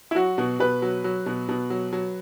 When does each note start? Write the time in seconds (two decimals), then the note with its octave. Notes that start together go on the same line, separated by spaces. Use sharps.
0.11 E4
0.15 F#3 F#4
0.38 B2
0.60 B2 B4
0.82 F#3
1.04 F#3
1.26 B2
1.49 B2
1.70 F#3
1.93 F#3